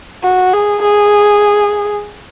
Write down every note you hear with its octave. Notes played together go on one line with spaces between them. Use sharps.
F#4
G#4
G#4